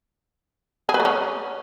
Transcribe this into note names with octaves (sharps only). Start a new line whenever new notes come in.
G#4
B4
A3
C#4